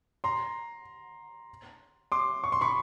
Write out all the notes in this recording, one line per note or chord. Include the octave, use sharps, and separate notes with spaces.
A#5 C6
C6 D6
C#6
C6
B5 C#6